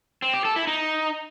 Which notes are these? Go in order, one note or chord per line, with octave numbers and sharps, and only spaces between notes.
C4
G4
A4
E4
D#4